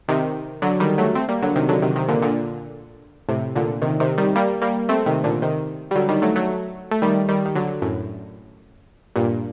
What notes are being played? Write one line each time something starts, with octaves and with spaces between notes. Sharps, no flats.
C3 D#3
D3 F#3
D#3 G3
F#3 A3
A3 C4
G3 A#3
D3 F#3
C3 D#3
D3 F#3
C3 D#3
C3 D#3
A#2 D3
A#2 D3
A2 C3
A#2 D3
C3 D#3
C3 D#3
D#3 G3
G3 A#3
G3 A#3
A3 C4
C3 D#3
A#2 D3
C3 D#3
G3
D3 F#3
D#3 G3
F#3 A3
F#3 A3
A3
D#3 G3
D#3 G3
D#3
D3 F#3
F#2 A2
G2 A#2